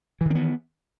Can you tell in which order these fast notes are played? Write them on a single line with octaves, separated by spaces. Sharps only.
E3 D#3 C4 B3